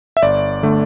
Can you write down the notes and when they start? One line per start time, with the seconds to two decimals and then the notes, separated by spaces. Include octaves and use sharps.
0.17 E5
0.22 G1 D5
0.63 D3 A3